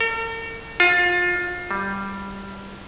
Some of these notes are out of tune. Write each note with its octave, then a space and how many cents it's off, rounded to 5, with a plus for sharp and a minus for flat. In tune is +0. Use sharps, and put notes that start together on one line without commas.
A#4 -45
F4 +25
G3 +0